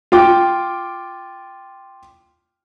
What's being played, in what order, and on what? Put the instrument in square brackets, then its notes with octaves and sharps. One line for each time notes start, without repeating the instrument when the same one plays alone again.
[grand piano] F4 G5 D6